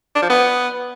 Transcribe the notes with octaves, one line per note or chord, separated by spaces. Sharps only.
D4
F3
B3